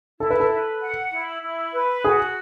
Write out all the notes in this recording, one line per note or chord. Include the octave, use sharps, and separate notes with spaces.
E4 A4
B4
A4
B4
F#5
E4
E4
B4
F#4 G#4